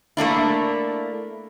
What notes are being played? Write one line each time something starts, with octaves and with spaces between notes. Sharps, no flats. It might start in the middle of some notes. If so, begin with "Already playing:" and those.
A3 A#3 D4 E4